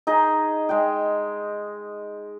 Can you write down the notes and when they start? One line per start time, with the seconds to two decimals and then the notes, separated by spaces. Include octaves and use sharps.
0.07 D#4 G#4 D#5
0.69 G#3 G5